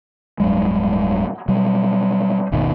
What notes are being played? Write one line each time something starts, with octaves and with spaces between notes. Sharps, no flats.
D1 G2 F#3 G#3
B2 F#3 G3
G1 D#2 B2 D#3